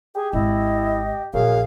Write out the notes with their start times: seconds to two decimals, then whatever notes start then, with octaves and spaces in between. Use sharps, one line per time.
0.15 G4 G#4
0.33 G#1 E4 D#5
1.34 A#1 F#2 G#4 F5